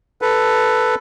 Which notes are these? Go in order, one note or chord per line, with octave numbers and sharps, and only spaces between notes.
A4 B4